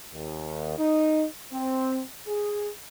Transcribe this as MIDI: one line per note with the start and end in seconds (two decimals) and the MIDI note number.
0.13 0.78 39
0.78 1.24 63
1.51 2.00 60
2.27 2.67 68